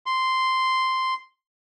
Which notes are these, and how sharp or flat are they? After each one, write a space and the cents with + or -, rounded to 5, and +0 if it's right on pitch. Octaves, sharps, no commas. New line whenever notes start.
C6 -5